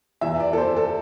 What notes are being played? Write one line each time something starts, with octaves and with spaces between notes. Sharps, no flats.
E2 E3 E5
D5
A4
C5
A4